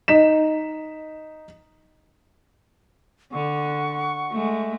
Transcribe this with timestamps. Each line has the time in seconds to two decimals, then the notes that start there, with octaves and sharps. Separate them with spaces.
0.08 D#4 B6 E7
3.32 D3 F#5 C#6
4.32 G#3 A3